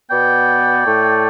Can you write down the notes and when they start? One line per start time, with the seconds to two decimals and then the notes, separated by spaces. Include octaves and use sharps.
0.10 B2 B3 D5 G5
0.85 A2 A3